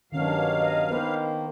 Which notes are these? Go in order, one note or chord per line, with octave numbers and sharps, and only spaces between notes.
G2 B2 D#3 F#3 C#4 D4 F5
D#5
D#3 A#3 B3 B4 C5